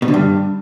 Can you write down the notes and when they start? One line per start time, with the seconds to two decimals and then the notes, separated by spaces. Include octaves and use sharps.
0.02 B2
0.08 D3
0.14 G2